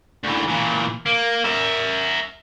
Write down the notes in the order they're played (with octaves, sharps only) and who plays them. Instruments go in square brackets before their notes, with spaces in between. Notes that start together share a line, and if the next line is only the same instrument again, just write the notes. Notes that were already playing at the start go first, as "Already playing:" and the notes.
[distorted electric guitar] D2 E3
A#2 E3
A#3
A#4 E5